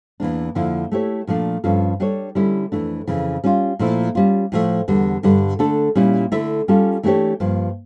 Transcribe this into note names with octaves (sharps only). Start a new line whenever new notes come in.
E2 E3 A#3 D4
F2 D3 F3 A#3 E4
A3 E4 G4 C#5
A#2 F3 A3 D4
G2 F3 C#4 F4 A4
G3 D4 A4 C#5
D3 G3 C#4 E4
F2 E3 A3 D4
F2 C#3 E3
G3 C#4 F4
A#2 F3 A3 E4
G3 C#4 F4
A2 F3 A3
E2 D3 G3
G2 D3 G3
D3 A3 D4 A4
A#2 G3 C#4 E4
D3 A3 E4 A4 E5
G3 C#4 F4 A4
E3 A3 D4 G4 C#5
G2 F3 A#3